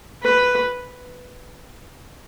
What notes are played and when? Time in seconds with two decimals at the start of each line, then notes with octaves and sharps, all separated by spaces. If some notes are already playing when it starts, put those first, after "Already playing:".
0.23 B4